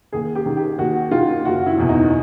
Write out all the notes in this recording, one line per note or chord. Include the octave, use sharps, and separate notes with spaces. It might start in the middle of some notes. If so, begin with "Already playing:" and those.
D#2 G#4
G4
D#3
G4
D#2 F#4
D#3 F4
F#1 F#4
E4
E2 B2
D#4